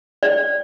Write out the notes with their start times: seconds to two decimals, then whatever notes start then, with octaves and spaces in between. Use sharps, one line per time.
0.23 D5